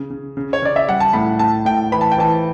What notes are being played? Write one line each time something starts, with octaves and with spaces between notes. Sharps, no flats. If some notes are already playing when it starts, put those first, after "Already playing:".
Already playing: C#3
C#3
C#3
C#5
C#3 D5
E5
G3 F#5
A5
A2 B5
A2 A5
A2 G5
E3 B5
A5
G5
E3 A5